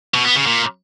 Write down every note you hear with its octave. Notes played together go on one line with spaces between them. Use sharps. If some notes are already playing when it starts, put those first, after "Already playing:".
B2
B3
C#3
A#2